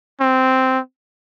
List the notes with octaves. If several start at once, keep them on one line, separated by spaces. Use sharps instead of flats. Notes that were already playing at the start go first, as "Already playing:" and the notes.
C4